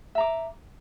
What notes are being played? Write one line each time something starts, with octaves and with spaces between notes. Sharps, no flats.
E5 A#5 D6